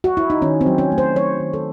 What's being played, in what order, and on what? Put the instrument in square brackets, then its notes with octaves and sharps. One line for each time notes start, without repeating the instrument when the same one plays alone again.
[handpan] F#4
E4
D#4
D#3 C#4
C4
F#3
C#4
A3
C5
F#3 C#5
D#3
A4